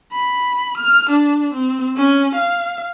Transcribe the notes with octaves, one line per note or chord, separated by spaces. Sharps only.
B5
F6
D4
C4
C#4
F5